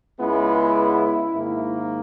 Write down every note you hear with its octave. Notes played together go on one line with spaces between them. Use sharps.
C#2 C#3 G#3 B3 E4
G#2 D#3 A#3